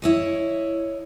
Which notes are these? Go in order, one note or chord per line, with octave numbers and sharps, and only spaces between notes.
E4 C#5 D#5